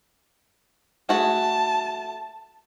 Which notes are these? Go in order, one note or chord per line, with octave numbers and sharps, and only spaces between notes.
A3 F#4 G#4 A5